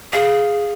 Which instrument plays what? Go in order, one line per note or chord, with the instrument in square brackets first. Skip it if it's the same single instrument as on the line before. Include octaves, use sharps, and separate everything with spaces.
[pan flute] G#4 [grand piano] F5